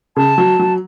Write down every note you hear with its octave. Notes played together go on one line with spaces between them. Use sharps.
C#3 A5
F#3
F#3